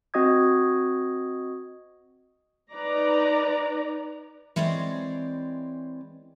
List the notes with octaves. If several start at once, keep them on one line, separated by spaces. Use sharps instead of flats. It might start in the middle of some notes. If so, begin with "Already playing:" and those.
C4 F#4 D#5 D#6 G#6
D#4 B4 D5 A#5
E3 G#3 C4 C#5 D5